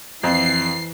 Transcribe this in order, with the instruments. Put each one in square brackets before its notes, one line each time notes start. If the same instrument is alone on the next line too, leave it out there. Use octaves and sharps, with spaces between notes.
[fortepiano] F2 [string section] E3 C7